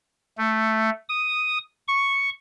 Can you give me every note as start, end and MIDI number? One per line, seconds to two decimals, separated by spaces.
0.38 0.90 57
1.09 1.58 87
1.88 2.30 85